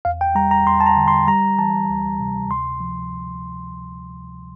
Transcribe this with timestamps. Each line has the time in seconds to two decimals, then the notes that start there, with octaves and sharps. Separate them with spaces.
0.05 E2 F5
0.21 G5
0.35 G3 A#5
0.51 A#5
0.66 E2 C6
0.80 A5
0.86 A#5
0.97 D3
1.08 C6
1.27 G3 A#5
1.58 E3 A5
1.89 D2
2.20 C3
2.50 D2 C6
2.80 F3